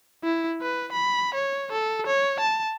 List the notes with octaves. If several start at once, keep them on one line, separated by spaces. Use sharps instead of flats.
E4
B4
B5
C#5
A4
C#5
A5